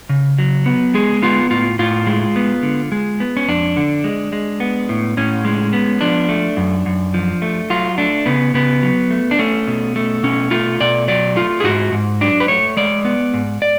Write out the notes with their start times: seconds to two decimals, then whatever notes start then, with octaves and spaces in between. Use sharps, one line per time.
0.09 C#3
0.38 F#3
0.66 B3
0.94 G#3 G#4
1.22 B3 F4
1.51 A2 F4
1.79 A2 F4
2.07 G#3
2.36 B3
2.63 D3
2.92 G#3
3.20 B3
3.37 C#4
3.48 F2 D4
3.76 D3
4.04 G#3
4.32 G#3
4.60 B3
4.89 A2
5.17 A2 C#4
5.45 G#3
5.73 B3
6.01 F3 D4
6.29 A3
6.57 F#2
6.86 F#2
7.14 F3
7.42 A3
7.70 F#3 F4
7.98 A3 D4
8.26 C#3 B3
8.54 C#3 B3
8.83 F#3
9.10 A3
9.31 D4
9.39 A3 C#4
9.67 B2
9.96 A3
10.23 B2 C#4
10.51 A3 F4
10.80 B2 D5
11.08 F#3 D5
11.36 A3 F4
11.60 G#4
11.64 G#2 F#4
11.92 G#2
12.21 F#3 D4
12.40 B4
12.48 A3 C#5
12.77 G#3 D5
13.05 B3
13.34 G#2
13.62 D5